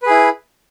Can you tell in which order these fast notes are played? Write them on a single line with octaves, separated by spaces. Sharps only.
B4 G#4 E4